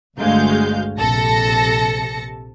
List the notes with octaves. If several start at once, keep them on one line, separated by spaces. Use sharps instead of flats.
G1 D2 G#3 F#4 F5 G6
A#1 C3 A4 A5 A#6 C#7